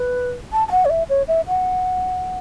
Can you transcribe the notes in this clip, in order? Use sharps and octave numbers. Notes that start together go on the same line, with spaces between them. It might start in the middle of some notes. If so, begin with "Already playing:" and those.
Already playing: B4
A5
A5
F#5
C#5
E5
C#5
E5
F#5